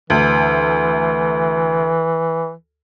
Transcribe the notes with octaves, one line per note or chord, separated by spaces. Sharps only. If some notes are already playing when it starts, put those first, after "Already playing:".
D2 E3